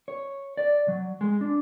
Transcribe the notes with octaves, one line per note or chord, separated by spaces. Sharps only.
C#5
D5
F#3
G#3
D4